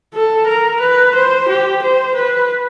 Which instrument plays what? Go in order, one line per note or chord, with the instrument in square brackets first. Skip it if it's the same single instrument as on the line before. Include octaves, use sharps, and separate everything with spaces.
[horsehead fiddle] A4
A#4
B4
C5
G4
C5
B4